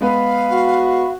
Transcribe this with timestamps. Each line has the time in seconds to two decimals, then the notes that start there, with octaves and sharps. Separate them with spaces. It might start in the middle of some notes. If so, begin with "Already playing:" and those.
0.01 G#3 B3 B4 F5 B5
0.50 F#4